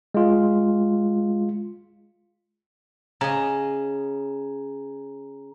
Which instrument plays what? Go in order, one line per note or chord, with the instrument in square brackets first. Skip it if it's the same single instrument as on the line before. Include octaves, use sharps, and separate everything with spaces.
[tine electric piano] G#3 F4
[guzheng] C#3 D#5 [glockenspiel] A#5